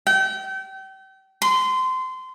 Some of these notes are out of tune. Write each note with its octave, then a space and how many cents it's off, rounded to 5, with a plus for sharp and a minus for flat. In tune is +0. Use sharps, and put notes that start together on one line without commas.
G5 -35
C6 -25